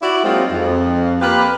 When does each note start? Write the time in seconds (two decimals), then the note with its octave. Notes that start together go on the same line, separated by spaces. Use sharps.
0.02 E4 F#4 D5
0.24 F#3 G#3 A#3 C4 D#4 F4
0.51 F2
1.21 A#3 F4 G4 B4